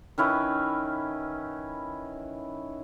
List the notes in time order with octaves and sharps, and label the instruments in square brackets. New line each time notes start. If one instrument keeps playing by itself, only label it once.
[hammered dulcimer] D#3 C#4 E4 B4